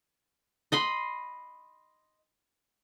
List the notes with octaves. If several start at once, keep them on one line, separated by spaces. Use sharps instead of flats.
D#5 B5 C6